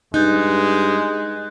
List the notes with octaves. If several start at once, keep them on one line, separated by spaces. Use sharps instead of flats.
G2 G#3 D#4 F#6 G6 A6